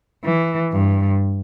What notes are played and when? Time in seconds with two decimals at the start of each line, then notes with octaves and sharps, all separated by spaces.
0.25 E3
0.72 G2